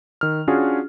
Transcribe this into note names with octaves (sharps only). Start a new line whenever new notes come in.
D#3 F6
C#4 D4 F4 F#4 G#4